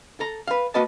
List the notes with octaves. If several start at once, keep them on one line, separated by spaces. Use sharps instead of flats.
A4 A#5
B4 F5
A#3 F#4 B4 D#5 A5